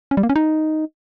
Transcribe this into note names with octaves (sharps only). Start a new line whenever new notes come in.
C#4
G3
A#3
C#4
D#4